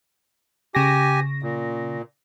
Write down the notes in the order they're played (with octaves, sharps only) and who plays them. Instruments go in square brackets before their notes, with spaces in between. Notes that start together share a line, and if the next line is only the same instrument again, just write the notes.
[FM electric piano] C#3 A#6 [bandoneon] G4 G#5
[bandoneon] A#2